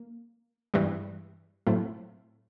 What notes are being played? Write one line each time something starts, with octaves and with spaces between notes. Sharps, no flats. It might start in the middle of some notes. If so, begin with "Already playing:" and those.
Already playing: A#3
G2 E3 G3
A2 F#3 A3 C4 E4